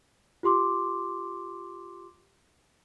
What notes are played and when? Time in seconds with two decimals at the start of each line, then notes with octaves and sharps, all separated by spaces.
0.43 F4 G4 C6 D6